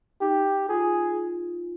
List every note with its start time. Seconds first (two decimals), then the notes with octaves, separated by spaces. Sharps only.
0.21 D#4 G4
0.69 F4 G#4